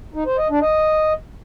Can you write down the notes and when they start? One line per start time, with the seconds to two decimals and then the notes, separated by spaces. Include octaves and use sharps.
0.14 D#4
0.26 C5
0.38 D#5
0.50 D4
0.62 D#5